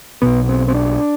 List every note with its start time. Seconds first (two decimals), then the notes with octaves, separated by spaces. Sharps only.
0.22 B1 B2 B3
0.49 C4
0.68 C4
0.74 D4